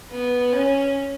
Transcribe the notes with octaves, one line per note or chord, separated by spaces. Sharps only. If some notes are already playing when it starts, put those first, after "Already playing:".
B3
C#4